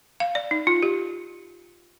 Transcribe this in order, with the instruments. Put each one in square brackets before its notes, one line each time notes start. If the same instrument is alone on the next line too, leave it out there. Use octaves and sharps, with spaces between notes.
[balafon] F5
D5
D#4
F4
G4